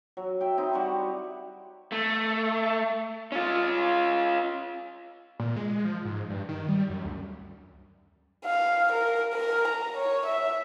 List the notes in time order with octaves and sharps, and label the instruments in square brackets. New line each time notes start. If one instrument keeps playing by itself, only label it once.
[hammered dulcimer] F#3
E5 G5
C4 D#4 E4
G3 F#4 F#5 C#6
[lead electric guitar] A3
C#4 F4
[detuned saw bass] A#2
G#3
F3
G#2
G2
D#3
G3
F#2
D2
[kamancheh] F5
A#4
A#4
A#5
C#5
E5